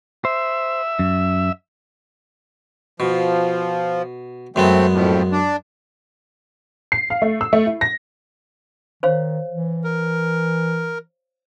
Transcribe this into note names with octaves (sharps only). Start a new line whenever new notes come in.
C5 E5
F#2
B2 F3
F#2 G#3 A3 B3 C4
F2 A2
D4
C7
F5
A3
E6
A3
E4
A#6
D#3 C5 C#5 F5
E3
A#4